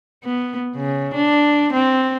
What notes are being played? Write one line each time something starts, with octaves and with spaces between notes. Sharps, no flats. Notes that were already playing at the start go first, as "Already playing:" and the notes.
B3
C#3
D4
C4